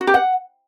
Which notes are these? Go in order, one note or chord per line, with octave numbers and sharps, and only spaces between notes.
F#4
G4
F#5